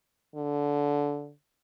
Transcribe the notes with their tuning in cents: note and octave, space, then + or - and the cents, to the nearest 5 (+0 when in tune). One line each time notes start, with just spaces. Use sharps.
D3 -15